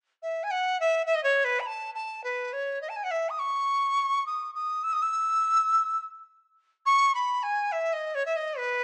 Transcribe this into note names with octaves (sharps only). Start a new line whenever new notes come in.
E5
G#5
F#5
E5
E5
D#5
C#5
B4
B5
A5
A5
B4
C#5
D#5
A5
G#5
F#5
E5
D#6
C#6
D#6
D#6
E6
D#6
E6
C#6
B5
G#5
E5
D#5
C#5
E5
D#5
B4